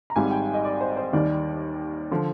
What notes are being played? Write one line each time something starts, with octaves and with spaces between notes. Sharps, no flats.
A#5
G#1 G#2 G3 G#5
G5
D#5
D5
C5
C5
D#2 D#3 G3 D5
D3 F3